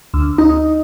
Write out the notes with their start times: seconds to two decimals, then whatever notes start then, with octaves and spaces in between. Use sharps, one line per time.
0.14 D2
0.38 D#4